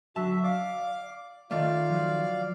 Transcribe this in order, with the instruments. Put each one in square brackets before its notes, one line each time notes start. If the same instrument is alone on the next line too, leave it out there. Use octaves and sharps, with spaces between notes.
[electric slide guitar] D3 F#3 [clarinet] F#4 [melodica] E5 [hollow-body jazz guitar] A5
[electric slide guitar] D5 [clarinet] F5 [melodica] D6
[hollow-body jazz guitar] D#3 A3 [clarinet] F4 [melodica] D5 F5
[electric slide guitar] F3 F#3 F#4